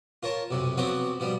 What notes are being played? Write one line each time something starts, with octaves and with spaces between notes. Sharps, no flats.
F4 A#4 C#5 A5
B1 F#2 C3
F3 F#3 B3 C4 F#4 G4
B2 F3 G3